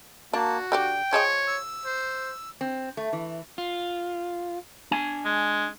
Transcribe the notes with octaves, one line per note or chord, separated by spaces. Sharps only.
A#3 D4 F#4 A5
D3 G4 D5 G5
F3 G#4 C#5 D#5
E6
C5
C4
A3
E3
F4
D4 G#5
G#3